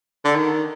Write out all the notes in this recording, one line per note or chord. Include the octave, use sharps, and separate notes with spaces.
D3
D#3